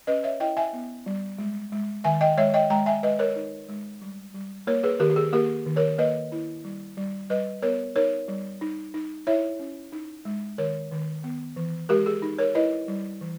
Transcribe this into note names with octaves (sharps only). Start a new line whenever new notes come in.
C#4 B4 D#5
C#5 E5
E4 D#5 G5
E5 G#5
B3
G3
G#3
G#3
D#3 E5 G#5
D#5 G5
G#3 C#5 E5
D#5 G5
G#3 G5 A#5
E5 G#5
G#3 B4 D#5
A#4 C#5
D#4
G#3
G3
G3
A#3 A#4 C#5
G#4 B4
D#3 G4 A#4
G4
G#4
A#3 G4 A#4
D#3
A#4 C#5
A#3 B4 D#5
E4
G3
G3
G3 B4 D#5
B3 A#4 C#5
D#4 A#4 C#5
G3
D#4
D#4
E4 C#5 E5
C#4
D#4
G#3
D#3 A#4 C#5
D#3
B3
E3
G#3 G4 A#4
G#4
D#4
A#4 C#5
E4 B4 D#5
G3
E3